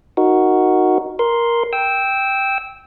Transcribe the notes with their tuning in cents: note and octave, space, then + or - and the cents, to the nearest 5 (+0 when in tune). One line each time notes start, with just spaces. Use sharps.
D#4 +0 F#4 +0 A#4 +0
A#4 +10 C6 +0
G5 +0 E6 -15